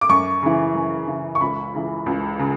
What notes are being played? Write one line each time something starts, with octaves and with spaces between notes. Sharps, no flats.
D6
F#2 C#6
C#3 E3
F#2
C#3 E3
C#6
C#2 B5
C#3 E3
C#2
C#3